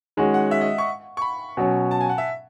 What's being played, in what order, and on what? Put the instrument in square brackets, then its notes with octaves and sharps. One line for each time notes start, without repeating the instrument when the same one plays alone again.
[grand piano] D#3 G#3 C#4 F#4
[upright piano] F#5
E5
D#5
C#6
C#6
B5
[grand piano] B2 F#3 C#4
[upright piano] A5
G#5
F#5
E5